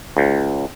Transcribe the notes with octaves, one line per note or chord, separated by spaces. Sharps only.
C#2